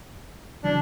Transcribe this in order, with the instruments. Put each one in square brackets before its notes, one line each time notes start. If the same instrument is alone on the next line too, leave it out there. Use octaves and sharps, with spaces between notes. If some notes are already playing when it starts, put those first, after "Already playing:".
[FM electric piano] C#3 E3 F#3 [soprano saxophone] D4